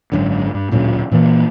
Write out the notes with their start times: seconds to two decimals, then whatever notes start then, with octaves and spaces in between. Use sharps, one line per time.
0.12 G#1 F#2 D3
0.54 G2
0.71 D1 A#2 C#3 F#3
1.11 A#2 E3 F3 A#3